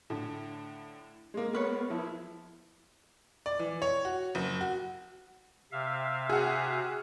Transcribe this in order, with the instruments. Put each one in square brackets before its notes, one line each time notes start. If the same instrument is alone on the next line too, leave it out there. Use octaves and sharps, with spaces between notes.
[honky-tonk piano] A2 D3
G#3 A#3
[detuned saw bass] B3 [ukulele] A#4 B4 C#5
[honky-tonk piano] F3 [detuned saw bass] E4
[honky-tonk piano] D5
E3
C#5
F#4
F#1
F#4
[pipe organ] C3 E5 F5
[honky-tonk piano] F#4 G#4